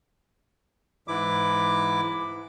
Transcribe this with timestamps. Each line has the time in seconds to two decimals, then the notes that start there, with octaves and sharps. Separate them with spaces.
1.08 G#2 E3 E4 D6